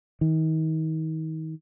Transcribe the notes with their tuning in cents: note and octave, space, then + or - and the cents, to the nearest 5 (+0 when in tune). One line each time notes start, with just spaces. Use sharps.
D#3 +35